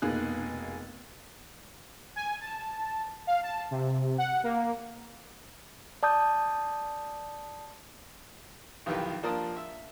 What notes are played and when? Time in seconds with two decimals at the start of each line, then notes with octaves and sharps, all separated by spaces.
0.02 F1 B2 A#3 D#4 G#4 F#6
2.16 G#5
2.41 A5
3.27 F5
3.43 A5
3.71 C3
4.18 F#5
4.44 A#3
6.03 D5 A5 D#6 G6
8.86 B1 F2 D#3 E3 G4 B4
9.23 F3 A#3 D4 A5 D#6
9.56 E5